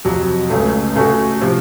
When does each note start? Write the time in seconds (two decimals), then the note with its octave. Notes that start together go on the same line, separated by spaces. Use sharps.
0.05 F2 C3 F#3
0.50 C#2 C#3 A3
0.95 C#3 A3 C#4 F#4
1.41 C3 F3